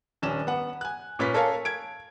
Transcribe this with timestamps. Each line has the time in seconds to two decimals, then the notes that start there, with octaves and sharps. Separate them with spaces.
0.22 D#1 C#4 D4 E7
0.47 B3 F#5
0.81 G#5 F#6
1.19 A#2 C#4 B4 B6
1.34 A4 A#4 C#5 F5 G#5 A5
1.65 G#6 D7